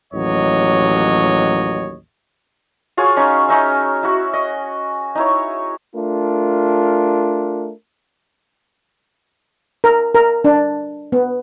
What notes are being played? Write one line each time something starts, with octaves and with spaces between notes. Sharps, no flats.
A1 D#2 F#3 C#5 D#5
F4 F#4 G#4 C#5
C#4 D#4
C#4 D#4 E5
E4 F#4
D#5
D#4 E4 C#5
A3 D4 F4 A#4
A#4
A#4
D4
B3